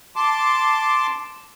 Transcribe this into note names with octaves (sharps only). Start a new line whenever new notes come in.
A5 C6 D6